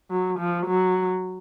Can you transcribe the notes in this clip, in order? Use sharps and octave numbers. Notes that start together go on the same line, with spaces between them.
F#3
F3
F#3